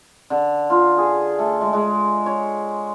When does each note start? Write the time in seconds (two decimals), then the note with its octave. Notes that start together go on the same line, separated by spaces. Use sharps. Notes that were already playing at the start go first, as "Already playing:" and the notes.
0.30 D3
0.70 F4
0.97 G#4
1.39 A3
1.61 G#3
1.73 G#3
2.26 C#5